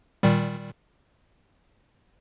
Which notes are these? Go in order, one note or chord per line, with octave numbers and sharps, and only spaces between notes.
A#2 D#3 G3